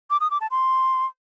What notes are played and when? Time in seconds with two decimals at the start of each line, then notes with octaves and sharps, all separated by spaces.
0.10 D6
0.21 D#6
0.31 D6
0.41 A5
0.51 C6